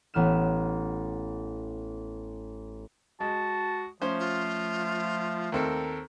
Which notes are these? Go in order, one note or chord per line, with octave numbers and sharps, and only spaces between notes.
A1 B3 F6 E7
G#3 F#4 A5
F3 A3 C#4 C5
F4
D#2 C4 A4 A#4